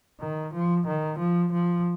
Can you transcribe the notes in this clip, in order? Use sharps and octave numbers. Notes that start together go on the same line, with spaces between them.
D#3
F3
D#3
F3
F3